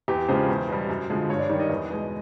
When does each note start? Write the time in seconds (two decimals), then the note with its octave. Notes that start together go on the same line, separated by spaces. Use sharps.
0.08 E2 G4
0.28 C#3 F3 G#3 C5
0.49 E2
0.68 B2 G3
0.89 F#2
1.09 D3 F3 G#3
1.29 G2 C#5
1.39 D5
1.49 D#3 G3 D5
1.60 D#5
1.70 E2
1.90 B2 G#3